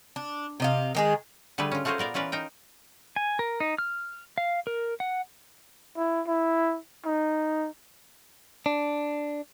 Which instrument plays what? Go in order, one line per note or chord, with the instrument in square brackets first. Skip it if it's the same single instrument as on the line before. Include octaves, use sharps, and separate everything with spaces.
[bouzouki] D4
C3 D#5 F5
D#3 G#3 G#4
[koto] D3 G3 A3 G#4 B4
C#4 F4
A3 F4 F#4 G#4 A#4 C5
A#2 B3 A#4 D5
E3 C#4 F4 A#4 B4 D5
D#4 A#4 G5
[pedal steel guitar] G#5
A#4
D#4
F6
F5
A#4
F#5
[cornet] E4
E4
D#4
[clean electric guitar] D4